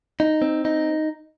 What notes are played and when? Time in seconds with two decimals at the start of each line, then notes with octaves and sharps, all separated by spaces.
0.20 D#4
0.42 C4
0.65 D#4